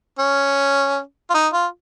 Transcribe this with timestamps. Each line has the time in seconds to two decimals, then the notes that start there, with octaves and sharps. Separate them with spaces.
0.19 C#4
1.30 F4
1.34 D#4
1.53 F4